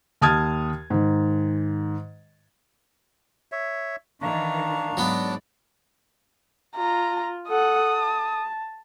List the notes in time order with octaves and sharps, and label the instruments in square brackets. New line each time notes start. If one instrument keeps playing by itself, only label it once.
[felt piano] D#2 A5 D#6 F6 G#6 A6
G#2 D#3
[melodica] C#5 E5
[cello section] D#3 E3 [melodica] D4 [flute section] F5 A#5 C#6
[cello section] G#2 D5 [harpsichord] F#3 B3
[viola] F4 [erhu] A#5
[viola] A4 F#5 [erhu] D#6
[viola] A5